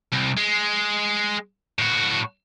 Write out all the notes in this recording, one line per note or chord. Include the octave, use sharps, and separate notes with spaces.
C2
G#3
A2 F#4